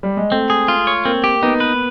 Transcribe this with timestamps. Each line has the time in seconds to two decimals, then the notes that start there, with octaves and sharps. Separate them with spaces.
0.03 G3
0.17 G#3
0.31 A3 C4
0.50 G#4
0.68 F4
0.87 C#5
1.05 A#3 C4
1.24 G4
1.42 B3 D#4
1.60 B4